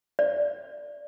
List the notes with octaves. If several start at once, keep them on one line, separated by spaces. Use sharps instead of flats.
D5